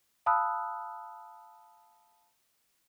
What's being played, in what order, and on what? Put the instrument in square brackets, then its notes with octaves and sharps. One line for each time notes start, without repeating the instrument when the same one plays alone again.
[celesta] F5 A5 B5 D#6 E6 F#6